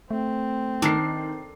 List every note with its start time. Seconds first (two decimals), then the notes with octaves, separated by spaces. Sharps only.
0.11 A3 C4
0.82 D#3 D4 A4 A#4 C7